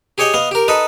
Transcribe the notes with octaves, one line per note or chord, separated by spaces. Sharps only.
G4 G#4 C#5 D#5 G5
B3 D#5 F5
G4 A#4
D#4 A4 B4 D#5